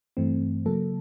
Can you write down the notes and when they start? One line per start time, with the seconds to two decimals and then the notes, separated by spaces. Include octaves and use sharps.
0.17 G2 E3 A3 C4
0.66 C#3 F#3 A#3 A4